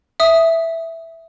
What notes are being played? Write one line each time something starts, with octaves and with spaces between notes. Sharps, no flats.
E5 D#6